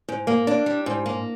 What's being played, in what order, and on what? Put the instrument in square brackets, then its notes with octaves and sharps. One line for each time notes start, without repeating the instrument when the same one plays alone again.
[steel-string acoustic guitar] G#2
A#3
D4
G3
G#2
A#3